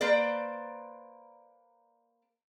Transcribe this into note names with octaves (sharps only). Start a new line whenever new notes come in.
A#3 B4 C5 D5